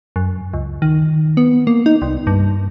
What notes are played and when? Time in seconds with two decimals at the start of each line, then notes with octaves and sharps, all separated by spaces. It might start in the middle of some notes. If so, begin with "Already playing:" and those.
0.16 F#2
0.54 C#2
0.82 D#3
1.37 B3
1.67 A#3
1.86 D#4
2.02 C2
2.27 G2